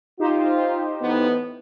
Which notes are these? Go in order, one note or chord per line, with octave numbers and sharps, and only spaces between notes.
D#4 F4 G4 C5
A2 E3 B3